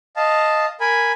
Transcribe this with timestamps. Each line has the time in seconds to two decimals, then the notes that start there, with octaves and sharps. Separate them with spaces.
0.16 D#5 F5 A5
0.80 A#4 G#5 B5